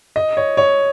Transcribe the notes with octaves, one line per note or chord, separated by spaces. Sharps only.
D#5
C#5
C#5